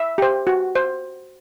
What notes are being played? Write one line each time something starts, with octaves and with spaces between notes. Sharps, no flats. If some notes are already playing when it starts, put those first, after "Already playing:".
Already playing: E5
G4 C5
F#4
C5